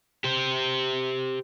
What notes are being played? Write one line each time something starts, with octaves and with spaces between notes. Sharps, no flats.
G4 C5